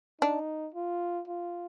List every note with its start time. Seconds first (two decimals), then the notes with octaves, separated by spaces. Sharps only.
0.21 D4 D#4
0.74 F4
1.28 F4